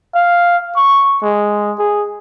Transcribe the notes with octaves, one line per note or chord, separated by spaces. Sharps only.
F5
C#6
G#3
G#4